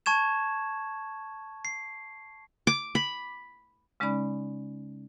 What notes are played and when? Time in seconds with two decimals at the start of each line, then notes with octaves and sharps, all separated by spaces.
0.06 A5 C#6 G#6 E7
1.65 C7
2.67 D6
2.95 B5
4.00 C#3 G#3 C#4 D#4 D5 B5